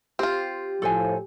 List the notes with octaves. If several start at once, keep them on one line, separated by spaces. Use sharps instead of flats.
C4 F4 G4
A2 F3 A4 C5 G#5